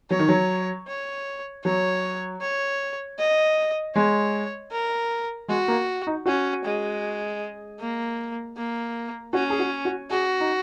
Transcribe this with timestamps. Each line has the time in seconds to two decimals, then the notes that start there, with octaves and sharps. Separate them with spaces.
0.11 F#3 C#5
0.19 D#3
0.28 F#3
0.87 C#5
1.64 F#3 C#5
2.41 C#5
3.19 D#5
3.95 G#3 C#5
4.71 A#4
5.48 G#3 F#4
5.68 A#3
6.07 D#4
6.26 C#4 F#4
6.65 G#3
7.80 A#3
8.57 A#3
9.33 C#4 F#4
9.50 G#4
9.59 F#4
9.85 F#4
10.10 F#4 G#4
10.40 D#4